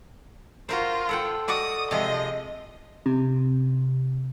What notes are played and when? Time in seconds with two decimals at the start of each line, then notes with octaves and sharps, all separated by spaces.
0.69 F4 F#4 A#4 C5
1.09 A4 F#5 G5
1.48 F#4 D5 D#5 D#6
1.91 C3 F3 G#3 D#5
3.06 C3